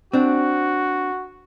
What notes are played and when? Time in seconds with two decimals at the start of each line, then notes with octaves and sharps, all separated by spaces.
0.13 C4 D4 F#4